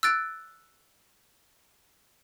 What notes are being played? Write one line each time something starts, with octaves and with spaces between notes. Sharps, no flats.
E6 F#6 A6 D7